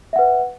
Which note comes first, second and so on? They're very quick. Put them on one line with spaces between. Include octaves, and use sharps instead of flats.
E5 F#5 B4